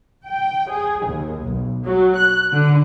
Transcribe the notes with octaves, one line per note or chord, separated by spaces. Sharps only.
G5
G#4
D#2
B1
F#3
F#6
D3